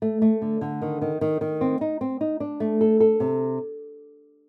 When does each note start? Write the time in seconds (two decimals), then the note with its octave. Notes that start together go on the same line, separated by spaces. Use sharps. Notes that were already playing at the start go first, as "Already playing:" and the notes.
0.02 A3
0.22 A3
0.42 D3
0.61 D3
0.82 D#3
1.02 D#3
1.21 D#3
1.41 D#3
1.61 C4
1.81 D#4
2.01 C4
2.21 D#4
2.40 D4
2.60 A3
2.81 A4
3.00 A4
3.20 C3